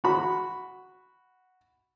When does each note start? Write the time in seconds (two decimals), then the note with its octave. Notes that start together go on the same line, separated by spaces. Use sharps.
0.04 F#4 B5